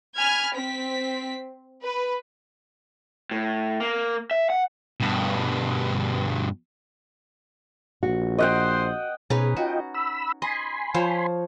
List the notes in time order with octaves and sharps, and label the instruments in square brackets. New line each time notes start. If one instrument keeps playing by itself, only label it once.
[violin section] G#5 B5 F6 G#6
C4 B6
B4
[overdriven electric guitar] A2
A#3
E5
F#5
[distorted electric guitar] G2 B2
[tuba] A#1 [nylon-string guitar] F#4
[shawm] C5 [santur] D#5 F#5 G5
[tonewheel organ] B2 G#4 [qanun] C#4 D#4 B4
[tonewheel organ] F4 D#5 G5 [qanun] F#4
[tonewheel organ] B5 E6
[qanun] D#5 [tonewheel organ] G#5 B5 C6
[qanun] F3 C5 C#5